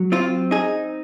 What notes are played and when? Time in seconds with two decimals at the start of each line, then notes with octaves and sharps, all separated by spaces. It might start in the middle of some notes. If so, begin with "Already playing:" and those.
Already playing: F#3
0.12 C4 F4
0.51 D#4 G#4